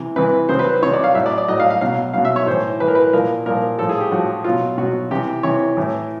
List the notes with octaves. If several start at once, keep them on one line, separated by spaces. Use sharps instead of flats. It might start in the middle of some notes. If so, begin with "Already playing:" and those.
Already playing: C3 E3
C3 E3 B4
C3 D#3 F#3 C5
B4
C5
C3 D#3 F#3 C#5
D5
F5
A2 F#3 E5
D5
D5
A2 F#3 D#5
F5
F5
B2 F#3 F5
B2 F#3 F5
E5
C#5
A2 E3 C5
A2 E3 B4
A#4
B4
A#2 F3 A#4
A#2 F3 A#4
A2 F3 A4
G#4
G4
A2 F3 F#4
B2 F#3 F4
B2 F#3 F#4
C3 E3 G4
C3 E3 C#5
A2 E3